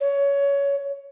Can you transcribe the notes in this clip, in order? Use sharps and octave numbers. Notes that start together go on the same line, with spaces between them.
C#5